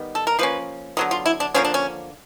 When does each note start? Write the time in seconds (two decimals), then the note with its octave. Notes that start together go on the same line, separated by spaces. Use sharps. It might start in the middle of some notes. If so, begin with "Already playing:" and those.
Already playing: D#3 G3 B3
0.15 A4
0.27 A#4
0.39 F3 A#3 C#4 B4
0.97 D3 F#3 B3 A#4
1.11 F4
1.26 E4
1.40 D4
1.54 D3 F3 A#3 C#4
1.65 D4
1.74 C#4